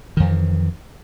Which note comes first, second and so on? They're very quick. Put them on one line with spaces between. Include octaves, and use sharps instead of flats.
D#3 F2 E3